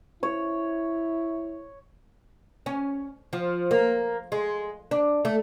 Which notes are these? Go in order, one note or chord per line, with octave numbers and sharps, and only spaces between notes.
E4 C#5
C#4
F3
A#3
G#3
D4
A3